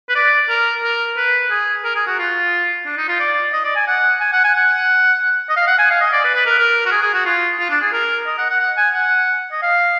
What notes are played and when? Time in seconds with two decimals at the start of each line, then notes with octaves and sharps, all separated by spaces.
0.10 B4
0.16 D5
0.49 A#4
0.83 A#4
1.18 B4
1.51 G#4
1.85 A#4
1.96 G#4
2.07 F#4
2.19 F4
2.86 D4
2.98 D#4
3.09 F4
3.20 D5
3.53 D#5
3.65 D5
3.76 G#5
3.88 F#5
4.21 G#5
4.33 F#5
4.44 G#5
4.54 F#5
5.50 D#5
5.57 F5
5.68 F#5
5.79 G#5
5.91 F5
6.01 D#5
6.13 D5
6.24 B4
6.35 B4
6.46 A#4
6.58 A#4
6.86 F#4
6.92 G#4
7.02 G#4
7.14 F#4
7.26 F4
7.59 F4
7.70 D4
7.82 G#4
7.93 A#4
8.27 D#5
8.38 F#5
8.50 F#5
8.61 F#5
8.77 G#5
8.94 F#5
9.52 D#5
9.63 F5